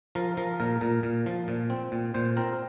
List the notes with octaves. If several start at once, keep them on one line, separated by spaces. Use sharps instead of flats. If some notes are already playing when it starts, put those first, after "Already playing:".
F3 A#4
F3 A#4
A#2 A#4
A#2 A#4
A#2
F3
A#2
C4
A#2
A#2 C5
C4 A#4